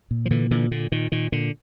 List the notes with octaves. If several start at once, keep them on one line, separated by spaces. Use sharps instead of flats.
A#2
F3
A#2 D3 E3
A#2 D3 E3
A#2 D3
A#2 D#3
A#2 D#3
A#2 D3